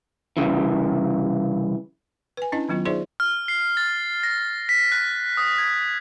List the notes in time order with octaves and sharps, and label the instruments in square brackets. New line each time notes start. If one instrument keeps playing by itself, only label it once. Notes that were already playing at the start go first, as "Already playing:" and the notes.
[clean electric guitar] C2 C#3 E3
[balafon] B4 G#5
C#4 D4 E4 D#5 A5
D#3 F#3 B3 F4
D#4 F4 G#4 C5 D5 E5
[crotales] F6
C7
A6
A#6
B6
F#6
D#6
G#6